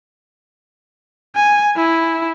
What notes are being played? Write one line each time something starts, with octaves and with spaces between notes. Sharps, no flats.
G#5
E4